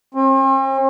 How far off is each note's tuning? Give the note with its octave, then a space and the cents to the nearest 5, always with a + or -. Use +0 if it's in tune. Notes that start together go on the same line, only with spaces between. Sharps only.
C4 +45